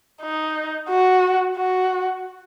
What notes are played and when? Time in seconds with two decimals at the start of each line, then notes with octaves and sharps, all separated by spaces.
0.22 D#4
0.89 F#4
1.57 F#4